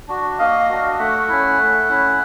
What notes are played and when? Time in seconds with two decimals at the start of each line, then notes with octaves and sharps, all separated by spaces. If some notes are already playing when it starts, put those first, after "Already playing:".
0.08 D4 F#4
0.39 A#3 D#5 F5
0.69 D4 F#4
0.99 A3 E5 F#5
1.28 C#4 E4
1.59 A3
1.89 C#4 E4